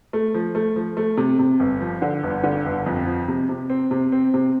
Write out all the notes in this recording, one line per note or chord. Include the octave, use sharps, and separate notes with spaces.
A3
F3
A3
F3
A3
C3
C3
G1
F3
D3
G1
D3
G1
F2
F3
C3
C3
C4
C3
C4
C3